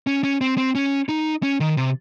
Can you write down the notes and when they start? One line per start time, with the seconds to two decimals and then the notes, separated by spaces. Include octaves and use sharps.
0.07 C#4
0.24 C#4
0.41 C4
0.58 C4
0.75 C#4
1.09 D#4
1.43 C#4
1.60 D#3
1.77 C3